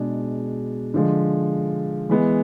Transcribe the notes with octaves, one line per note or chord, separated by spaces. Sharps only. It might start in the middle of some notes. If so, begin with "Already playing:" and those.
Already playing: B2 G#3 D4 G#4
D3 F3 G#3
E3 G#3 B3